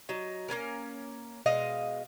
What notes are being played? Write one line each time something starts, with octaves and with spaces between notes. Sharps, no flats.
F#3 D#4
A#3 B3 C#4 A#4
B2 G#3 D#5 F5